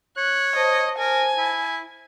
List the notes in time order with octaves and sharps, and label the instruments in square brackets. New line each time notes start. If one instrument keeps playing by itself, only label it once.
[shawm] C#5 [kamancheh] F#6
[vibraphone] C5 A5 [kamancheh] D#5
[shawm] A#4 [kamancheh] G#5
[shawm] E4